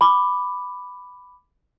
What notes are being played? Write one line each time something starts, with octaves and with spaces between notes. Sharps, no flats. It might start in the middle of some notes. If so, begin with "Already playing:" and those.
B5 D6